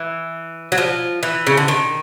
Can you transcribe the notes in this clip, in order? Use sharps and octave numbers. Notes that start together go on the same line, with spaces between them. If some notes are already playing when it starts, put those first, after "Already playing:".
Already playing: E3
F#3
F3
E3
C#3
D3
D#3